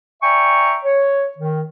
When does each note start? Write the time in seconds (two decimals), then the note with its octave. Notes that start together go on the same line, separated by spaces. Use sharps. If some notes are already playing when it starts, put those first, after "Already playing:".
0.22 D5 E5 G5 G#5 A#5 C#6
0.84 C#5
1.37 D#3